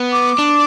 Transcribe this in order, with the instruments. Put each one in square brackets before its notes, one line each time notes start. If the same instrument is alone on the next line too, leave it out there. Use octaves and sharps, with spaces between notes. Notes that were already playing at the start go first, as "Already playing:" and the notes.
Already playing: [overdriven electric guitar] B3
[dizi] D6
[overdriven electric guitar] D4